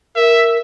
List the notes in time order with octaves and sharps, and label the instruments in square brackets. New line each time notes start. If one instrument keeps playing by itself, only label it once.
[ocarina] A#4 [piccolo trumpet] E5